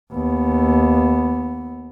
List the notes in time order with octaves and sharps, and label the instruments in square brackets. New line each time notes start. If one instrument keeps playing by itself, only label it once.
[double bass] D#2 B3